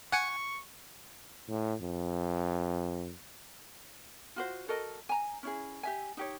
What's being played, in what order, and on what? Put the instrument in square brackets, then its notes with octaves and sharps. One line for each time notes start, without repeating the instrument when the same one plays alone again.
[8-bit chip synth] F#5 G#5 C#7 [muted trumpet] C#6
[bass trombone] A2
F2
[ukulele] F4 F#4 C5
F#4 A4 A#4 D#5
G#5 A#5
C#4 E4 G#4
G4 E5 G#5
D#4 G4 C#5